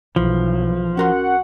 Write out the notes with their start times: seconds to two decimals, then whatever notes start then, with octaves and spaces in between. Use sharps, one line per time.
0.16 B1 E3 F3
0.97 C#4 F#4 A#4 F#5 C6